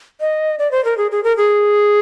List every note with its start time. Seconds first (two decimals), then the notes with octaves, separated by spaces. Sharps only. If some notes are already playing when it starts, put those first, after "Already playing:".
0.20 D#5
0.59 D5
0.71 C5
0.85 A#4
0.97 G#4
1.11 G#4
1.24 A#4
1.37 G#4